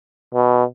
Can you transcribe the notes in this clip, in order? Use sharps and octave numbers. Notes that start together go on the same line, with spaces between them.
B2